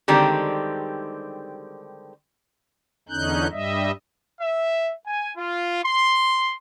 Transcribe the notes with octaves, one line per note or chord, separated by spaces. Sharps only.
D3 D#3 G3 G#3 C4 G4
E2 D3 C#4 D#4 F#6 G6
G2 G3 D#5 E5
E5
G#5
F4
C6